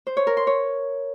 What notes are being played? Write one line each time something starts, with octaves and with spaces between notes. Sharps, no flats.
C5
C#5
A#4
C6
C#5